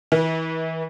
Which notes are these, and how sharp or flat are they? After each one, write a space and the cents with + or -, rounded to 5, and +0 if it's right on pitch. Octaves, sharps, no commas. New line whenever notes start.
E3 -30